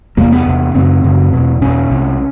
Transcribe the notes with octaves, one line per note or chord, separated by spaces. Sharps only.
E2 C3 A#3
B3
E2 C3
F#2 C#3 C4
F#2 C#3
E2 B2
E2 B2 C#4
C2 C3